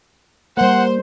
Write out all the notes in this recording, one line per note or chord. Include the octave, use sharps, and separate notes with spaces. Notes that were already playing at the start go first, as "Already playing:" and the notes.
G3 A#3 A#4 C5 F#5